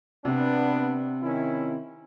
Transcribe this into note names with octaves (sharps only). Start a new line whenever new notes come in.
C3 B3 D4
D#3 C#4 E4